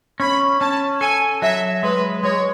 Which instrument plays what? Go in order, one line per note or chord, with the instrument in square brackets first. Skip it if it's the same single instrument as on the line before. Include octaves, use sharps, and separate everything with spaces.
[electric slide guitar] C#4 [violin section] B5
[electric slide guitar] C#4 [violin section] A5
[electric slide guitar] A4 [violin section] G#5
[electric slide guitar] F#3 [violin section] E5
[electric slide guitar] G#3 [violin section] B4
[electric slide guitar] G#3 [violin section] C#5